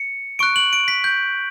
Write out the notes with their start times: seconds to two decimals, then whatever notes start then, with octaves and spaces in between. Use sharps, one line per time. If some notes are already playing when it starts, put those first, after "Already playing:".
Already playing: C#7
0.39 C#6 F#6 D7
0.56 F#7
0.73 D7
0.88 B6
1.04 G6